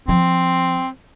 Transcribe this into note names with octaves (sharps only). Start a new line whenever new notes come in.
F3 C4 E4